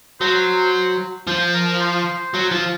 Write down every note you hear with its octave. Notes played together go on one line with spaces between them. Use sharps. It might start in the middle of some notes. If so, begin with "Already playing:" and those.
F#3 C5
F3 C5
A#4
C5
F#3
F3